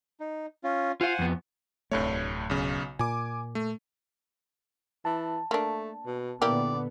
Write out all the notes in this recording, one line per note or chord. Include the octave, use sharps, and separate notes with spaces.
D#4
C#4 F4
F4 C5 F5 F#5 G#5
F2 B3
D1 C2 G2 A3 C#5
B1 C#3
A#2 G#5 D6
A3
E3 A5
A3 A#3 D4
B2
A#2 D3 A#3 B3 E4 G4 D5